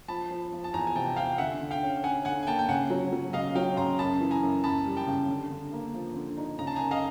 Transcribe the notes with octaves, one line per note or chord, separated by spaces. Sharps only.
F3 A5 B5
F3
F3
A5
E2 G#5 A#5
G#5
C3 G5 A5
F3 F5 G5
D3 E5 F#5
D3
F5 G5
C#4
C#4 F#5 G#5
D3 F#5 G#5
G#5
A#3 G5 A5
G5
C#3 F#5 G#5
F#3
F#3
C#3 D#5 F5
F#3 F5 G5
C#3 A#5 C6
F#2 A5 B5
E3
G#5 A#5
F#2
F#2 A5 B5
G3
G5 A5
C#3
D3
D3
A#3
F3
D3
D#4
C#3 A#5
A5
F#2 G#5 A#5
D#5 F5